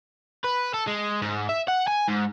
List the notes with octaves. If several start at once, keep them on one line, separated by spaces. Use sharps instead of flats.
B4
A4
G#3
G#2
E5
F#5
G#5
G#2